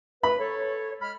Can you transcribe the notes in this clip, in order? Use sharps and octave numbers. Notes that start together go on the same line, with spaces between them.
B4 B5
A4 C#5
G#3 B5 F6